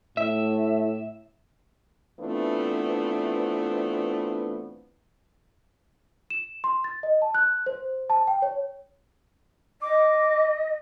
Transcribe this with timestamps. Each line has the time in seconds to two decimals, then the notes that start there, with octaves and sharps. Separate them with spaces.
0.17 A2 E5
2.20 E3 A3 B3 C4 D4 F4
6.30 E7
6.64 C6
6.84 A6
7.03 D#5
7.22 A5
7.35 F#6
7.66 C5
8.10 A5
8.27 G5
8.42 C#5
9.81 D#5 D6